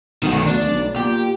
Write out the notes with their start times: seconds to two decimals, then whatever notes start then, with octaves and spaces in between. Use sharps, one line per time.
0.23 B1 D#3 F#4
0.46 D2 D4
0.70 B1
0.96 A#2 G4